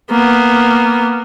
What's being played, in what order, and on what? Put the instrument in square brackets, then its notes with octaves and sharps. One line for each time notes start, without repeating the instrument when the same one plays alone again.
[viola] A#3 B3